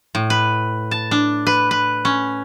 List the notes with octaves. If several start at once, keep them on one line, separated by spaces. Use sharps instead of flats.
A2
B4
A5
D4
B4
B4
C#4